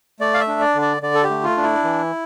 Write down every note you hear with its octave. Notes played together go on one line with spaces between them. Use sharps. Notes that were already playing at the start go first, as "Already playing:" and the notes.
A3 D5
F5
E5
D4
D5
D3
D5
D3 D5
A4
G4
A3
F4
D4
E4
E3